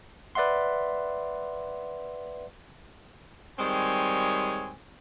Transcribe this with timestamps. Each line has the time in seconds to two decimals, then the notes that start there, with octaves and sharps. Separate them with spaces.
0.35 B4 D5 E5 F#5 C6
3.59 D#3 G3 G#3 C4 C#5 G#5